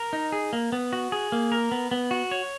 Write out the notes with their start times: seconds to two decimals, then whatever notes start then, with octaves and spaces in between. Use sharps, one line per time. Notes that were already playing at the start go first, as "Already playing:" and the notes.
Already playing: A#4
0.13 D#4
0.32 G#4
0.53 A#3
0.72 B3
0.93 F#4
1.12 G#4
1.32 A#3
1.52 A#4
1.72 B3
1.91 B3
2.11 F#4
2.31 C#5